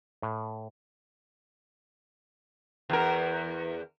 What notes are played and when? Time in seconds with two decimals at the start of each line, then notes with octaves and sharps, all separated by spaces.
0.22 A2
2.90 E2 A#4